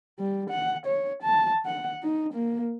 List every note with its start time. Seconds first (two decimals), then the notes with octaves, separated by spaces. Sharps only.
0.19 G3
0.50 F#5
0.86 C#5
1.23 A5
1.65 F#5
2.03 D#4
2.33 A#3